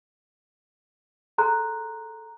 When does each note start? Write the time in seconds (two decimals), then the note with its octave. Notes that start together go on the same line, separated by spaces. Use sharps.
1.38 G#4 A4 A#5 C6 F#6